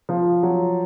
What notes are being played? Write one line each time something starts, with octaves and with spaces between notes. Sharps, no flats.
F3
F#3